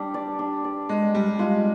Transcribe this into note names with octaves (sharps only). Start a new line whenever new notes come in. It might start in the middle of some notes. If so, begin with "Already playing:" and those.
Already playing: G3 D4 G4
D5
D4
D5
G#3 D5
G3 D5
G#3 F4